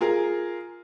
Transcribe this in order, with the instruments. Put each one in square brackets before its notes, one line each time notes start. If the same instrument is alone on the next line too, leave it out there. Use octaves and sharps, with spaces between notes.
[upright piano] F4 G#4 A#4